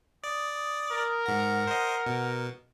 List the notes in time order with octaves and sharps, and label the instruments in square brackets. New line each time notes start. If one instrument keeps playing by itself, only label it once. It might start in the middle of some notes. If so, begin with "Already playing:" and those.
[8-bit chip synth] D5 [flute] D#6
[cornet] A#4
[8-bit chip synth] G#2 A#5 [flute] F#5
[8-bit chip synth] C5 D#5
B2